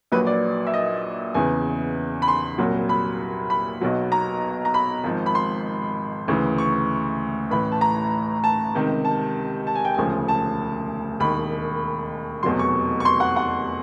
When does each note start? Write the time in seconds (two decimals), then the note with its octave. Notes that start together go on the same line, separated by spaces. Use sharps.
0.12 A#1 A#2 F#3 B4
0.27 D5
0.67 E5
0.74 D#5
1.34 E2 C#3 E3 G#5
2.22 B5
2.28 C6
2.58 C2 A#2 F#3
2.89 B5
3.50 B5
3.81 B1 B2 F#3
4.12 A#5
4.65 A#5
4.74 B5
5.04 G#1 G#2 F3
5.26 B5
5.35 C6
6.28 D2 C#3 E3
6.58 C#6
7.51 A1 A2 E3 B5
7.72 A5
7.81 A#5
8.44 A5
8.74 C#2 C3 D#3
9.05 A5
9.67 A5
9.75 G#5
9.85 G5
9.94 E1 D2 C#3 F3 G#5
10.28 A5
11.20 E1 D#2 D#3 B5
12.43 F1 E2 B2 F#3 C6
12.59 C#6
13.00 C#6
13.05 C6
13.20 F#5
13.36 F#5